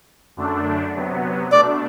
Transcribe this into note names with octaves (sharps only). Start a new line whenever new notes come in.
F#2 D3 A3 D4
C3 F#3 B3
B2 A3 D4 D5